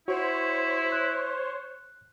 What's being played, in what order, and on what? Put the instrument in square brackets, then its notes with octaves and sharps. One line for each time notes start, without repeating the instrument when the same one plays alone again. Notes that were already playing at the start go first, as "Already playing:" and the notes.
[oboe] E4 [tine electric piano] F#4 [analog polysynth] C5 C#5
[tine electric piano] F#6